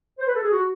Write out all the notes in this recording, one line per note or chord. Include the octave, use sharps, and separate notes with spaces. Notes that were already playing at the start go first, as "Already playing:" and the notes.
C5
B4
A4
G#4
F#4